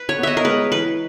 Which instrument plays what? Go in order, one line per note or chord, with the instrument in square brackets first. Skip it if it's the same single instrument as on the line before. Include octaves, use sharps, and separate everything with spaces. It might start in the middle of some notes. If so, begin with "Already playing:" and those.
Already playing: [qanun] B4
C#5
[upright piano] B3
[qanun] D#5 E5
A#4
[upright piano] G#3 [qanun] B4
[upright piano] E3 [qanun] B4